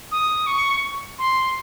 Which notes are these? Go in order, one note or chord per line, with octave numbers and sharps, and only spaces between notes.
D#6
C#6
C6